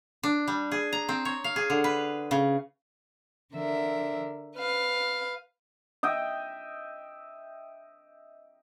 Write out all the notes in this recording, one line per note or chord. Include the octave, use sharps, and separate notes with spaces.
D4
G3
G#4
A#5
C4
C#5
F5
G#4
D3
B4
C#3
D3 A#4 E5
B4 F5
D#5 E5 G5